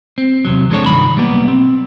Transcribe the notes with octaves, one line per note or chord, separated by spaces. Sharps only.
C4
E2 C3 F#3
F3 G#3 C4 D4 A4 C#5
C2 G2 D#3 B5
B1 G3 A#3 B3
C4